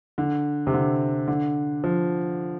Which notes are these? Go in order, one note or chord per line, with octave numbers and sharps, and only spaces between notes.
D3
C3
D3
D3
F3